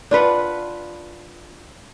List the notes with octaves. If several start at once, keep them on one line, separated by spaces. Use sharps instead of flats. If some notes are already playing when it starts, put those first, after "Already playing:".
D4 F4 B4 F#5